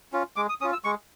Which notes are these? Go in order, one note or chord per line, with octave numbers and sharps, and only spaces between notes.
C#4 F4
G#3 D6
D#6
C#4 F4 D#6
E6
G#3 C#6